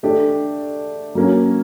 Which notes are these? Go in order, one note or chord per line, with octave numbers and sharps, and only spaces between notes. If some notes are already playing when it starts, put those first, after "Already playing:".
A3 D4 G4
F#3 A#3 C#4